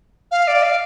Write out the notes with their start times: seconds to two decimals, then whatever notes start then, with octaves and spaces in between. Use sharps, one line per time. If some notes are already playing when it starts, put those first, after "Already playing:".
0.31 F5
0.47 D5
0.63 F5